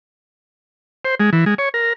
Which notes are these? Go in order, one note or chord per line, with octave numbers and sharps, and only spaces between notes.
C5
G#3
E3
G#3
C#5
A#4